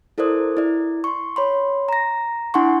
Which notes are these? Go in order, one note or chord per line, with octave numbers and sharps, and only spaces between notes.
E4 A4 A#4 C5 D5 D#6
E4 D5
C6 C#6
C#5 B5 C6
A#5 A#6
D4 E4 F#5 G#5 C6 C#6